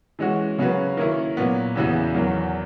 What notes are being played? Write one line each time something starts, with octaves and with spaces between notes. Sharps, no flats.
E3 G#3 C#4 F#4
C#3 F#3 C#4 F#4 B4
D#3 A#3 C#4 E4
A#2 F#3 B3
E2 C#3 E3 B3 F#4
E2 D#3 F#3